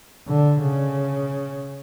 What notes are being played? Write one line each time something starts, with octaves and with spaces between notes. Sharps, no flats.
D3
C#3